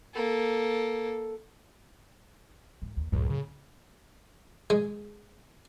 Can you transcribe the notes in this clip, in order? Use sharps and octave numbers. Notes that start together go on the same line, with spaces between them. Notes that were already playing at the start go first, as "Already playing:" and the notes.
A#3 A4
G#2
D#2
C#2 F#2 A2
C#3
G#3